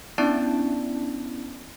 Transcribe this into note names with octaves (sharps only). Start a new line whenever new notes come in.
B3 C#4 D4 E4 D5 A5